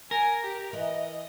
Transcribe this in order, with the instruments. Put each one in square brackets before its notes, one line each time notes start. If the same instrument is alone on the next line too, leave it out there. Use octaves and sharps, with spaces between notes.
[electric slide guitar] A#4 [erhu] G#5
[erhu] G4
[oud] E3 [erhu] D#5